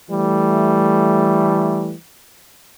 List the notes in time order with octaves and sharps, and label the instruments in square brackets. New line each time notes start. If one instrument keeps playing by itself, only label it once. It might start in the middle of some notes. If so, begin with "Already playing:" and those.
[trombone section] E3 G3 A3